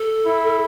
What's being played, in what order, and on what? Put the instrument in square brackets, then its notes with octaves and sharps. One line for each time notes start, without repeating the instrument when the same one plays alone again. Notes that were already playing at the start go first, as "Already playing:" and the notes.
Already playing: [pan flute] A4
[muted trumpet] E4